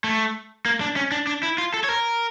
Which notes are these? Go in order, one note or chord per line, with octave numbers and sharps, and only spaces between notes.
A3
A#3
D4
C#4
D4
D4
E4
F4
A4
C#5
A#4